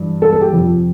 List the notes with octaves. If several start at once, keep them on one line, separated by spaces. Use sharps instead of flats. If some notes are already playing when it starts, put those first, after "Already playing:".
Already playing: G2 E3
A4
A4
G4
F2 C3 F3